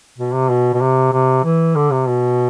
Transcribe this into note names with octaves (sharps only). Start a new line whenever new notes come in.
B2
C3
B2
B2
C3
C3
E3
D3
C3
B2